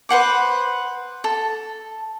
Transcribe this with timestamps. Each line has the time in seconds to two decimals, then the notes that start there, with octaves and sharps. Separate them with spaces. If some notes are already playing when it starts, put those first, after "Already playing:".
0.09 B4 C5 F#5 D6
1.24 A4